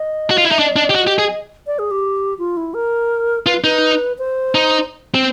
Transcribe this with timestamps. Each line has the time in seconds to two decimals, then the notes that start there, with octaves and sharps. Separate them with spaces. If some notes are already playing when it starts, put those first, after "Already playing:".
Already playing: D#5
0.30 F#4
0.38 F4
0.45 E4
0.49 D#4 E5
0.59 D4 D#5
0.76 D4
0.90 G4
0.95 F#4
1.07 G4
1.19 G#4
1.67 D5
1.79 G#4
1.91 G4
2.39 F4
2.57 E4
2.74 A#4
3.46 F4 B4
3.64 D#4 B4
4.18 C5
4.55 D#4
5.14 C4